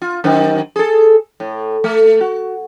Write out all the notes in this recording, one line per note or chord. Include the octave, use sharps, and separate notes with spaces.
F4
F#2 D#3 C5
G#4 A4
A2
A3
F#4